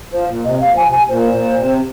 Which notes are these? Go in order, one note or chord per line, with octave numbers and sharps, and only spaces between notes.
F3 C5
A#2
C3 D#5
A#2 F5
F3 G#5
C3
G#5
A#2 C5
A#2
C3